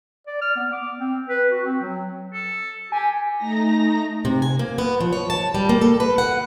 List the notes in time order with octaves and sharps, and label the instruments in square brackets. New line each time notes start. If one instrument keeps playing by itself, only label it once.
[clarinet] D5
F6
B3
D6
C4
B4
F#4
C4
F#3
[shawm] A4
[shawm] G4 [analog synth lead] G#5
[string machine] A3 D#4 A#5 A#6
[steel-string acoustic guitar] C3
G#5
A#3
B3
F3
C#5
A5
G3
A#3
A4
B4
F#5